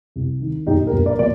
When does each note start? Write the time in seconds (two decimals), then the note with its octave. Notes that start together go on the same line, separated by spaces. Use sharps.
0.16 C2
0.41 D#3
0.67 A#1 D#4 G4
0.87 G4 A#4
0.93 A#1
1.06 A#4 D5
1.19 A#2 D5